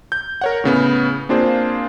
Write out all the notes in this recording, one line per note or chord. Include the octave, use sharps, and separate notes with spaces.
G6
A#4 C#5 F#5
A2 C#3 B3
A#3 C4 D4 F4 G#4 C5